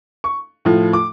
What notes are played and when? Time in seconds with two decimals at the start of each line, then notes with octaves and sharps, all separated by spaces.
0.24 C#6
0.65 A2 F3
0.93 D6